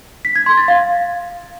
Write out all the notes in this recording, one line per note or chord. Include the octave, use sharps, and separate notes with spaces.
B6
G#6
C6
A6
F5